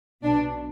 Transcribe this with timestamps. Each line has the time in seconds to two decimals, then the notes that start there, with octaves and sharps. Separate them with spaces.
0.23 B1 B2 D4